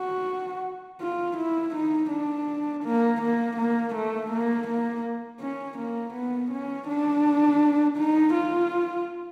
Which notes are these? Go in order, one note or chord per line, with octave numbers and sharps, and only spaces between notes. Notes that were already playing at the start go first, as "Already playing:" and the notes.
Already playing: F#4
F4
E4
D#4
D4
A#3
A#3
A#3
A3
A#3
A#3
C#4
A#3
B3
C#4
D4
D#4
F4